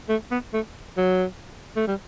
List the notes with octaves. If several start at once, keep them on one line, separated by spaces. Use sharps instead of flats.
A3
B3
A3
F#3
A3
G3